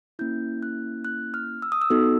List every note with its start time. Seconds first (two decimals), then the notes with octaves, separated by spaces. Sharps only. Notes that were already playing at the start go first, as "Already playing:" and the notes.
0.19 A#3 C#4 E4 G6
0.63 F#6
1.05 F#6
1.34 F6
1.62 E6
1.72 D#6
1.82 E6
1.90 B3 D#4 F#4 A4